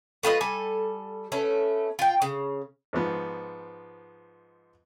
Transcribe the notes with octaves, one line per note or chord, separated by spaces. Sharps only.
A3 F4 B4 D#5
G3 A4 G#5
A3 B3 C#4
F4 G5
C#3
G#2 F3 B3